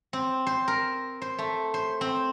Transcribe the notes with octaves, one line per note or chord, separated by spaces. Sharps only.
C4
C5
A#4
C5
A3
C5
C4